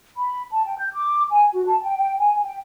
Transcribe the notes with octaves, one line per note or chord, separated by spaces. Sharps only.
B5
A5
G5
G6
D6
G#5
F#4
A5
G5
G5
G#5
G5